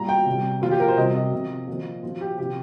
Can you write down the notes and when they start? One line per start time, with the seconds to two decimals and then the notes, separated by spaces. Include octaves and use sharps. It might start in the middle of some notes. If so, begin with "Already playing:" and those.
Already playing: A#2 G3 A#5
0.09 G5
0.26 C3 G3
0.62 A#2 F3 F4
0.71 G4
0.80 A#4
0.88 C5
0.97 C3 G3 D#5
1.15 D#5
1.33 C3 F3
1.67 A#2 F3
2.03 A#2 F3 F4
2.21 G4
2.38 C3 F3 G4